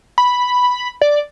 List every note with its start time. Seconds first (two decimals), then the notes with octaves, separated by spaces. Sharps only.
0.18 B5
1.01 D5